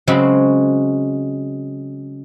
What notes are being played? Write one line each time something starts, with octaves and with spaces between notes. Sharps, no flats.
C#3 F#3 G#3 C4 F#4 B5